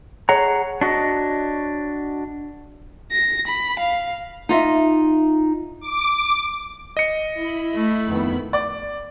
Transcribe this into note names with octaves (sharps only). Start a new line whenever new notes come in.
G#4 C#5 F#5 A#5
D4 F#4 D#5
A#6
B5
F5
D#4 F4 D#5 E5
D6
D#5 C#7
E4 B5
A3
F2 D#3 B3
D5